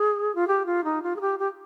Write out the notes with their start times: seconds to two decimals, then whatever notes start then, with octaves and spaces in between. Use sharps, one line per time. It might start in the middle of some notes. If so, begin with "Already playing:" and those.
Already playing: G#4
0.35 F4
0.48 G4
0.66 F4
0.84 D#4
1.03 F4
1.16 G#4
1.21 G4
1.39 G4